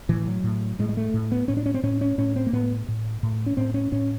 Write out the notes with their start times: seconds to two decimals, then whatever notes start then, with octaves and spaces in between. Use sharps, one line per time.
0.09 A2 E3
0.26 F#3
0.44 A2
0.79 A2 G#3
0.89 G#3
0.97 A3
1.14 A2
1.32 B3
1.48 A2 C#4
1.57 D4
1.66 C#4
1.74 C4
1.83 A2 C#4
2.01 C#4
2.18 A2 C#4
2.36 C4
2.47 A#3
2.53 A2 B3
2.88 A2
3.23 A2
3.46 C#4
3.57 A2 C4
3.74 C#4
3.92 A2 C#4